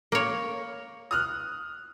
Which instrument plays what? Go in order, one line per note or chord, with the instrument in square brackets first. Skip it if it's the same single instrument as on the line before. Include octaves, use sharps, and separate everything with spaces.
[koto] A#3 C#5
[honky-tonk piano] D#6 F6 F#6